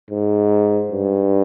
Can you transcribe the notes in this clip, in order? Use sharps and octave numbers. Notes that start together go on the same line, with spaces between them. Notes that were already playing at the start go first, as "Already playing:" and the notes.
G#2
G2